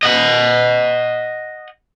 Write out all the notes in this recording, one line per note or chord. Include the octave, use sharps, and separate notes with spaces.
D#5 F#5